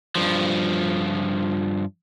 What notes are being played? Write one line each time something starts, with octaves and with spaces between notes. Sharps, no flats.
G2 F3